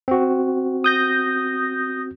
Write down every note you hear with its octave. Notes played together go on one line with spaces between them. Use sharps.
C4 F#4
D#6 G6 A#6